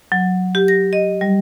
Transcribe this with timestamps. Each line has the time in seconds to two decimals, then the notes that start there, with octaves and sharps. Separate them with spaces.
0.12 F#3
0.55 G4
0.68 A#6
0.93 D#5
1.21 G3